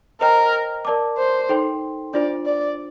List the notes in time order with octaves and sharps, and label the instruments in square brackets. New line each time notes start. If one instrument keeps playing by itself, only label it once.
[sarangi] A#4 [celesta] C5 D#5 G5 A#5
[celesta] A#4 D5 A5 D6
[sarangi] C5
[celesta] D#4 A4 C5 G5 C6
[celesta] D4 F4 C5 [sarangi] D5
[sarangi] D5